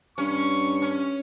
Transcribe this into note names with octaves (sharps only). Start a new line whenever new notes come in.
G2 C#4 C#6
C#4